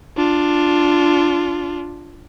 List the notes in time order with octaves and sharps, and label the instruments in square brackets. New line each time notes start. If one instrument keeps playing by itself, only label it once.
[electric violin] D4 F4